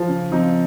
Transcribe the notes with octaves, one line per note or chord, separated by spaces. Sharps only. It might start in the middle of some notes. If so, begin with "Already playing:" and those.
Already playing: F3
C#3
F3 C4 D#4